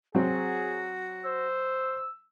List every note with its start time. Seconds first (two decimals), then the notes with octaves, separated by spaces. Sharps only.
0.15 F#3 C4 F#4 G#4
1.25 C5 E6